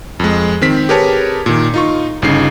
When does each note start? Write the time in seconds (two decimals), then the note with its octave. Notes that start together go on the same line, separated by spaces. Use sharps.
0.20 F2 G#3
0.61 D#3 C4 B6
0.89 G4 G#4 A#4 B4 C#5 A5
1.46 A#2 D#3
1.74 D#4 F4 C#6
2.22 G1 C#3 D#4 C7